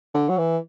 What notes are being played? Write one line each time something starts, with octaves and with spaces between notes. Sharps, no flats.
D3
F#3
E3